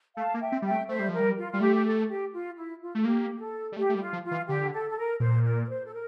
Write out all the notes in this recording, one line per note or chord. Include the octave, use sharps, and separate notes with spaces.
A3 F5 A5
A#3
E5 G5
C4
G3 E5 G5
A3
A3 C5 E5
G3
F3 A#4
G3
F4
G3 F4
A3 G4
G4
A4
G4
F4
E4
F4
A3 A4
A#3 G4
G4
A4
G3
A3 G4
A3
G3 G4
F4
F3
F4
E3
D3 G4
A4
A4
A#4
A#2 C5
A#4 D5
A#4
C5
A4
A#4